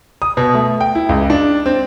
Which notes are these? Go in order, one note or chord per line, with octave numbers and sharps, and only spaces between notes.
D#6
B2
A3
G5
E4
C#2
D4
C4